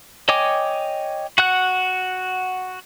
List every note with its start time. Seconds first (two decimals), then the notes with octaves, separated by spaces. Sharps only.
0.29 C#5 D#5 G5 G#5 D6
1.38 F#4 F#5 F#6